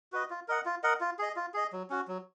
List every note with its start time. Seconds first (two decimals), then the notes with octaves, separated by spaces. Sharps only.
0.12 F#4 B4 D#5
0.30 F4
0.48 A#4 D#5 F#5
0.65 F4
0.83 A#4 D#5 F#5
1.01 F4
1.19 G#4 D#5
1.36 F4
1.54 G#4 D#5
1.73 F#3
1.90 C#4 F#4
2.08 F#3